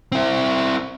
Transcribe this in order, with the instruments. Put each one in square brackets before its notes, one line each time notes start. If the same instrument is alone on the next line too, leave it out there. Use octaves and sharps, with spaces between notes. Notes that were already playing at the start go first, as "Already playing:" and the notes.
[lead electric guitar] C4 E4